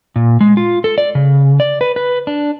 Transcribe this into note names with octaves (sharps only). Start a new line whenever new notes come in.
A#2
G#3
F4
A4
D5
C#3
D5
B4
B4
D4